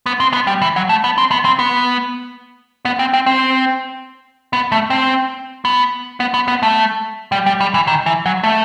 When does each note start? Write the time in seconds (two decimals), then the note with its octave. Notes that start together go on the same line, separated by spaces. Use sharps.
0.06 B3
0.20 C4
0.33 B3
0.47 G3
0.62 E3
0.76 F#3
0.89 A3
1.04 B3
1.18 C4
1.31 B3
1.45 C4
1.59 B3
2.85 B3
2.99 C4
3.13 C4
3.26 C4
4.53 B3
4.72 A3
4.90 C4
5.65 B3
6.20 B3
6.34 B3
6.48 B3
6.63 A3
7.32 G3
7.46 G3
7.60 G3
7.74 E3
7.87 D#3
8.06 E3
8.26 F#3
8.44 A3